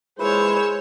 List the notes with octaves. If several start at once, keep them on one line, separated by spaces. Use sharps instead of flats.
A#2 E3 G#3 G#4 C5 C#5 B5 E6